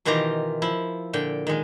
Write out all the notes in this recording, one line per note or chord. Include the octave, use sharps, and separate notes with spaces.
B2 D#3 E3 F4 G4 A#5
F3 E4
A#2 D3 G5
D#3 G#3